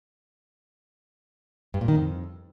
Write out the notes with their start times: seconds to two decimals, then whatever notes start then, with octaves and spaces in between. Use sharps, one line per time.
1.74 G2
1.81 A#2
1.88 D#3
1.95 F2